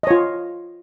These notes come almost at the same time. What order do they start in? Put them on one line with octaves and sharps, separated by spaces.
D#5 C#5 F4